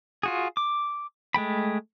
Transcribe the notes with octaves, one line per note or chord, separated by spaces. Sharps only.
F4 F#4 G#4
D6
G#3 A3 G5 B5